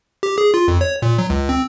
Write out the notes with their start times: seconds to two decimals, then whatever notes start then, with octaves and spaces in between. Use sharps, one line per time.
0.23 G4
0.38 G#4
0.54 F4
0.68 F2
0.81 C#5
1.02 A#2
1.18 F#3
1.30 C#2
1.49 C4